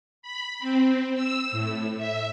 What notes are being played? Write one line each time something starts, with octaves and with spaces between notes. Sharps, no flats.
B5
C4
E6
A2
E5